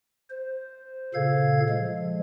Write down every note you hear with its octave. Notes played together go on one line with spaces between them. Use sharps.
C5
A#2 C#3 A4 F5 G#6
F3 G#3